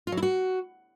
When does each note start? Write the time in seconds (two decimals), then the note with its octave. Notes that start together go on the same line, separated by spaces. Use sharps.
0.07 F4
0.12 F#3
0.17 E4
0.23 F#4